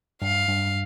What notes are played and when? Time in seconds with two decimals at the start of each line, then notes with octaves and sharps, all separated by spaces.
0.22 G2 F5
0.48 G2